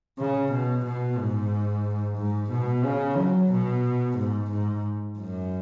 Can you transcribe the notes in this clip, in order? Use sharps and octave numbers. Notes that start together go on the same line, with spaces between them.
C#3
B2
B2
G#2
G#2
B2
C#3
F#3
B2
G#2
G#2
F#2